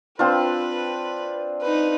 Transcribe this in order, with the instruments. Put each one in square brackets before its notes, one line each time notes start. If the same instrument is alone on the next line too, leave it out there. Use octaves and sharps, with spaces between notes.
[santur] C4 D4 F4 [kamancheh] B4
[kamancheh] D#4 B4